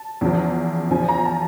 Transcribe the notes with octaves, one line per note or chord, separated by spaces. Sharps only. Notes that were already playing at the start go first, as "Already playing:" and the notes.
Already playing: A5
E2 C#3 F3
E2 C#3 F3 G#5
A#5
A5